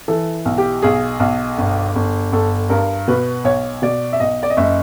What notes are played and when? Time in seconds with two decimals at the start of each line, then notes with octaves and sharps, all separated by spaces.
0.08 E3 A4
0.45 B1
0.58 G4
0.82 B1 G#4
1.20 B1
1.58 G1
1.96 G1
2.33 G1 A4
2.69 G2 A#4
3.08 B2 B4
3.44 B1 C#5
3.82 B2 D5
4.13 E5
4.20 B1 D#5
4.43 D5
4.50 D#5
4.57 F#1 E5